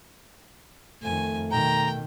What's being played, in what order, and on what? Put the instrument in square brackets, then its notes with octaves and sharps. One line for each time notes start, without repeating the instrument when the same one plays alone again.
[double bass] F2 D#3 [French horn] A3 [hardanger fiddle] G#5
[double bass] B2 D#3 [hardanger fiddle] G5 [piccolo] A#5